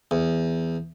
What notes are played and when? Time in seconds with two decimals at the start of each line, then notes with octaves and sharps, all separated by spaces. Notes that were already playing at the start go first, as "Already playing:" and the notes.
0.11 E2